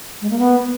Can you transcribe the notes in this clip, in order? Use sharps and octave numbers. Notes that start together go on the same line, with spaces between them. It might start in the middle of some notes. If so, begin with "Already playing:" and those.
G#3
A#3
B3